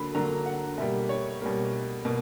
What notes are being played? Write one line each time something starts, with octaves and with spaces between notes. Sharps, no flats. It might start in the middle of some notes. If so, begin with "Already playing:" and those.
Already playing: D3 F#3 A#3 B5
D3 F#3 A#3 A#5
F#5
B2 G3 A#3 E5
C#5
B2 G3 A#3
B2 A#3